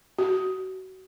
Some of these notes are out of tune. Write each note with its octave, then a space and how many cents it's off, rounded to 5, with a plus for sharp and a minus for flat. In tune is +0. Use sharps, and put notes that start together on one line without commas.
F#4 +25